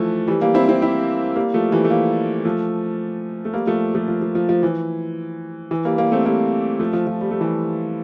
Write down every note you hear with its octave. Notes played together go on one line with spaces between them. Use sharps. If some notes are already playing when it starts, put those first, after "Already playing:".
Already playing: E3 F3 A3
E3 G3
G3 A#3
C4 E4
C4 E4
E4 G4
G3 A#3
F3 A3
E3 G3
A3
G3 A#3
F3 A3
A3
G3 A#3
F3 A3
F3 A3
F3
F3
F3
F3
E3
E3
G3 A#3
G3 A#3
A3 C4
G3 A#3
F3 A3
F3
F3
G3
A3
E3 G3